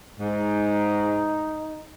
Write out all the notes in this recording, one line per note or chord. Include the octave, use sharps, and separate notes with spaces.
G#2 D#4